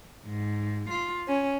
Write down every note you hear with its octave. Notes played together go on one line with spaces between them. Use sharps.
G#2
F4
C#4